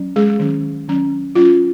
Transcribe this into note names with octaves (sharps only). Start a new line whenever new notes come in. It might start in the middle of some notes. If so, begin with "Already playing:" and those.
Already playing: F#3 C#4
G#3 G#4
D#3 F#3 C#4
D#3 F#3 C#4
F#3 C#4 F4